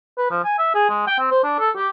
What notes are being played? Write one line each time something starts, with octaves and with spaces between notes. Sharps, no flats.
B4
F3
G#5
E5
G#4
G#3
G5
C4
C5
D4
A4
G4